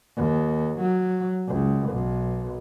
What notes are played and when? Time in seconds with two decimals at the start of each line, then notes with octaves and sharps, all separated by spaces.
0.17 D#2
0.80 F#3
1.48 C#2
1.90 B1